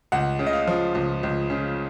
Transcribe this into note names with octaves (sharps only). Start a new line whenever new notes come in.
C#2 F#5
C#3
D#5
F5
F3
C#2
C#2
C#3